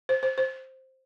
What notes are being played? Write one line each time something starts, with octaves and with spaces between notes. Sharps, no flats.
C5
C5
C5